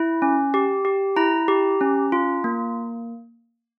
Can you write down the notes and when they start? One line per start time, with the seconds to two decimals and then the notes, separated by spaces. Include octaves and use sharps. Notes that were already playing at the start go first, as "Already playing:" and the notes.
Already playing: E4
0.22 C#4
0.54 G4
0.85 G4
1.16 E4 A#5
1.48 G4
1.81 C#4
2.12 F4
2.44 A#3